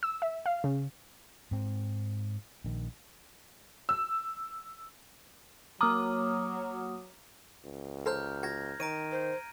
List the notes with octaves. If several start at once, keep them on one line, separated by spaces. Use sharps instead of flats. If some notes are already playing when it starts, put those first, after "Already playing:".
E6
E5
F5
C#3
G#2 C4
A#1 D#3
E6
F#3 A#3 A#5 D6 D#6 F6
C#2
A4 C5 A#5 F6 G6
F#4 G#6 A#6
D#3 C#5 A#5 D7 D#7
C5